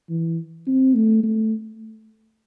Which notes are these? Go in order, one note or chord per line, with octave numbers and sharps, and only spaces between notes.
E3
C4
A3
A3